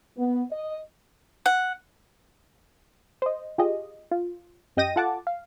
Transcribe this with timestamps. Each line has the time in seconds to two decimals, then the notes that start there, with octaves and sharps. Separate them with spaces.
0.17 B3
0.52 D#5
1.46 F#5
3.22 C5 D#5
3.58 F4 G4 G#4 D#5
4.11 F4
4.77 F#2 G4 D#5 G5 A#6 D#7
4.96 F4 A4 F#5 A5 D6
5.27 F5